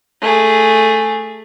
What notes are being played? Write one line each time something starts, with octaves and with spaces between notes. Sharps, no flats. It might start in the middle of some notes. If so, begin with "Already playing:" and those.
A3 G#4